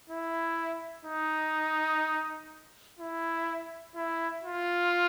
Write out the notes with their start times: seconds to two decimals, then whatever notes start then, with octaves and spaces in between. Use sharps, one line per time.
0.09 E4
1.05 D#4
2.99 E4
3.95 E4
4.43 F4